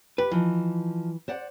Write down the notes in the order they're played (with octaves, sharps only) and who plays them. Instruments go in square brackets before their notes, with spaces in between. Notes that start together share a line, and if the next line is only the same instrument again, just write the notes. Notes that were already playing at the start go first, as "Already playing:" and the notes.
[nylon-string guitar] G4 [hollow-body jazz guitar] B4
[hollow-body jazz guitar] E3 [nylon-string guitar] F3 D#4
[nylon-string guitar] C5 D5 F#5